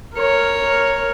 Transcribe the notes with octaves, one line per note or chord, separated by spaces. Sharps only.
A#4 C#5